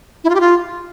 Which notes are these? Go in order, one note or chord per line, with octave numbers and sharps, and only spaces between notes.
E4
F4
G4
F4